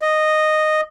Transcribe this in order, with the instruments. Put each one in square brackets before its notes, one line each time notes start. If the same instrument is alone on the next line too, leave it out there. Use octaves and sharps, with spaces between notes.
[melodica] D#5